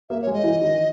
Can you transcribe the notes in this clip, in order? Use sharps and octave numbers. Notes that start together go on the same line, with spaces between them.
A#3 E5
C#5
G#3
D#5
E3
D#3